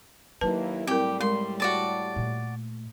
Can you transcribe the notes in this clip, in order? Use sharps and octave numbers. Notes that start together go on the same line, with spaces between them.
D#2 F#3 A#3 D#4 E4 B4 A5
A2 G3 C4 E4 G4 A#4
G#3 A#4 C6
F#4 D5 A5
A#2 A3